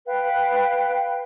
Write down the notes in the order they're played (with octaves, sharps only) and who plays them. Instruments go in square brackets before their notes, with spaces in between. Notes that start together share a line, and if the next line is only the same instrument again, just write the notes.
[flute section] B4 F5 G5